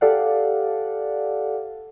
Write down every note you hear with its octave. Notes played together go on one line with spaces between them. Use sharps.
G4 A4 D5 F5 F#5